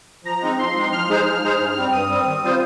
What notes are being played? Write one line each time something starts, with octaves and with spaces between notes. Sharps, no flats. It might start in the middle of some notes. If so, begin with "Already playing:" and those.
F3 A#5
G#3 C4 D#4
F3 C6
G#3 C4 D#4
F3 F6
G#3 D#4 G#4 C5
F3
G#3 D#4 G#4 C5
G2
G3 C4
G2 D#6
G3 C4
D#3
G3 C4 F4 C5